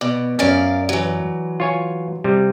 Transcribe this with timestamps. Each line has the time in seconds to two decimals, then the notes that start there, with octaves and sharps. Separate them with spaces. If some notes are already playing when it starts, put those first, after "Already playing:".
0.01 B2 D5
0.39 F#2 C#4 A#4 D5 F5
0.89 E3 F#3
1.60 F4 C#5 G#5
2.24 C3 G3